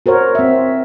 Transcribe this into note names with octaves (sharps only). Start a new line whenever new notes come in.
F#4 A#4 C5 C#5
C4 E5